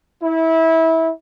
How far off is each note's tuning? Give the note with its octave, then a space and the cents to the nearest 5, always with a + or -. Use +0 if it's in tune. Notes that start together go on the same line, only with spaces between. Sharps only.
E4 -25